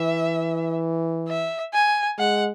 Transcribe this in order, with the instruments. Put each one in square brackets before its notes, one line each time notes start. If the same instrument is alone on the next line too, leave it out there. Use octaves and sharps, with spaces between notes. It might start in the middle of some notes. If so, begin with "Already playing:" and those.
Already playing: [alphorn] E3 [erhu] E5
[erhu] E5
G#5
[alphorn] G#3 [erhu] F#5